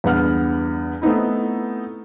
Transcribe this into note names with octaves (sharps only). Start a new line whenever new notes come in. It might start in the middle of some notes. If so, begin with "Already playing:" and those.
E2 G2 B3 F#5 F6
A3 B3 C4 D#4 E4